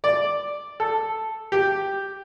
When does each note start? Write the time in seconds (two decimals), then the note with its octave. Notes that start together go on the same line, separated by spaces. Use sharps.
0.04 D5
0.80 A4
1.52 G4